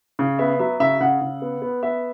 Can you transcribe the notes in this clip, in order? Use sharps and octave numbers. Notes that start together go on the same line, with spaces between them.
C#3
B3 E5
F#3 E5
C#3 E5
C#3 F#5
C#3
B3
B3
B3 E5